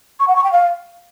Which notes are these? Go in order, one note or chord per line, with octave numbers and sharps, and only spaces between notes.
C#6
F#5
C#6
G5
F5